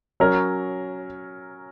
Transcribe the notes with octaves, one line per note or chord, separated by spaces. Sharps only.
F#3 C#4 A#4